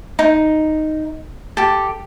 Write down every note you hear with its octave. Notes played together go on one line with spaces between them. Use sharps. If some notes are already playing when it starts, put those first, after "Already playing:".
D#4
G4 A4